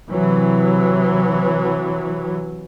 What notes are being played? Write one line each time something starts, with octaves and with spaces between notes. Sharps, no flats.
C3 E3 F#3